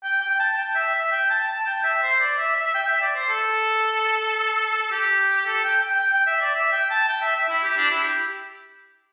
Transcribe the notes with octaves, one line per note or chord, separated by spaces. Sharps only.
G5
G5
A5
G5
E5
E5
G5
A5
A5
G5
E5
C5
D5
E5
E5
E5
G5
E5
D5
C5
A4
G4
A4
G5
G5
G5
G5
E5
D5
E5
G5
A5
G5
E5
E5
E4
G4
D4
E4
G4